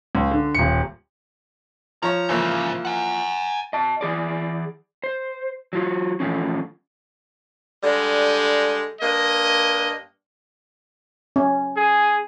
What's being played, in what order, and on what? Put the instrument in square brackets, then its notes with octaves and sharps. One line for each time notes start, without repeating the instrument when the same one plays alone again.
[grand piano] C#2
D3
D#1 C#7
[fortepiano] F3 C#5 [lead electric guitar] A#5
[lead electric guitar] G#2 C#3 [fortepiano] E3 F3 A#3
[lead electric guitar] F#5 G#5
[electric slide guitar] D#5 A5
E3 G#4 D5
C5
F#3 F4 F#4
E3 F3 A3 C#4
[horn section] D3 G3 G#3
G2 A#3 D#5
[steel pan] C#4
[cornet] G#4